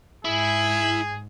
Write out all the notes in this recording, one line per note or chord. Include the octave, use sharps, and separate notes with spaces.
G#2 E4 G#4